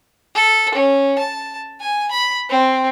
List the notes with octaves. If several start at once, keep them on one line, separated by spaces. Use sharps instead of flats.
A4
C#4
A5
G#5
B5
C4